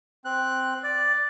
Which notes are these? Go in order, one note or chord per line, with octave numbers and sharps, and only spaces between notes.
C4 F#6
D5